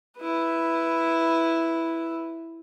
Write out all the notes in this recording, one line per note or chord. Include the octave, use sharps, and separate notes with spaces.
E4 B4